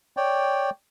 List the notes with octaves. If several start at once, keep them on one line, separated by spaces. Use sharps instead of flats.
C#5 D5 G5